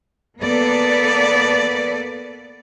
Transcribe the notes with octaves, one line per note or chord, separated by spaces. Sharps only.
A#3 B3 A4 B4 D5